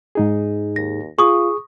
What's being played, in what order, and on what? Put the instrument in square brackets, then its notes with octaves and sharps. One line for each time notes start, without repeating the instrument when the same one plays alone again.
[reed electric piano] G#2 D#4 G#4
[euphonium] D#2 [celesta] A#6
[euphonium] F4 [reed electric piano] G#4 [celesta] C#6 D#6